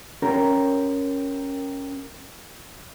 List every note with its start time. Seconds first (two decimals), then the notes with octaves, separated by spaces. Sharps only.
0.22 C#4 G4 A#4